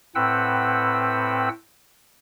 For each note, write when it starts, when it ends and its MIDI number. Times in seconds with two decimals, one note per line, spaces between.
0.15 1.49 45
0.15 1.49 60
0.15 1.49 71
0.15 1.49 78
0.15 1.49 79
0.15 1.49 88